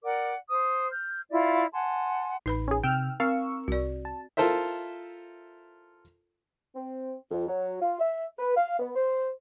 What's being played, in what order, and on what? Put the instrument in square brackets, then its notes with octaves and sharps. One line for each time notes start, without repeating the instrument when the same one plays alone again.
[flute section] A#4 D5 F#5 D6
C5 D#6
F6 G6
E4 F4 D5 E5
F#5 G#5 A5 C6
[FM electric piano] A1 [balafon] D#4 B4 B5
[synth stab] C#4 G#4
[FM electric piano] C3 [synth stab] G5 E6 F6
[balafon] C4 [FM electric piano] A#4 C#6 E6 [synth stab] F5
[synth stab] C2 [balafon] F#4 D5
[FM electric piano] A5
[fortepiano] E4 F4 A4 A#4 C5 E5
[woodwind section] C4
F2
F#3
F4
E5
B4
F5
B3
C5